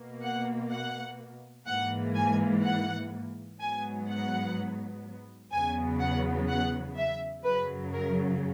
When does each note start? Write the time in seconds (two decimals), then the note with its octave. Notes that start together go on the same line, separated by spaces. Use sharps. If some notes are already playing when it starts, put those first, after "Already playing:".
Already playing: B2 A#3
0.22 F#5
0.71 F#5
1.66 G#2 E3 A#3 F#5
2.15 G#5
2.63 F#5
3.60 G#2 F#3 B3 G#5
4.08 F#5
5.52 E2 C#3 F#3 B3 G#5
6.00 F#5
6.48 F#5
6.97 E5
7.44 F#2 C#3 F#3 B4
7.93 A#4